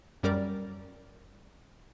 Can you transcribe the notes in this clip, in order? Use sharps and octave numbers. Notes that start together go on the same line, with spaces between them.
F#2 G3 A#4 D5